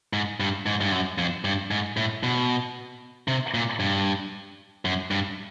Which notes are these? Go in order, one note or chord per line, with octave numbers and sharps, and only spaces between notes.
G#2
G2
G#2
G2
F#2
F2
G2
G#2
A2
B2
C3
A#2
G2
F#2
G2